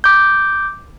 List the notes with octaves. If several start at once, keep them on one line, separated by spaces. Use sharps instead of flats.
D6 G6